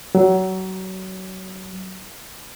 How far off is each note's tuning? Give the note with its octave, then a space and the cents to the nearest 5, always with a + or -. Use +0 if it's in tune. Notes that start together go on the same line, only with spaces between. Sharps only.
F#3 +25